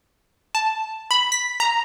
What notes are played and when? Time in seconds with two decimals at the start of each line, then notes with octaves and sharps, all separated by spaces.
0.55 A5
1.11 B5
1.32 B6
1.60 A#5